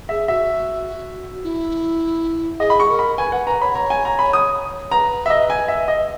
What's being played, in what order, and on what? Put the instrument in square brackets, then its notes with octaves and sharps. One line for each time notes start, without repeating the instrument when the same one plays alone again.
[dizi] G#4 [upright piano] E5
[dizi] F#4 [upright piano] E5
[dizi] E4
[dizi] G#4 [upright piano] D#5
[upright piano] B5
C#6
[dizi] A#4
[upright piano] B5
[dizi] B4 [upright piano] G#5
[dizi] B4 [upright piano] F#5
[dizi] B4 [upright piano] A#5
[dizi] C#5 [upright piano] B5
[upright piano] A#5
G#5
A#5
B5
D#6
[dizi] B4 [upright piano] A#5
[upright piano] E5
D#5
G#5
E5
D#5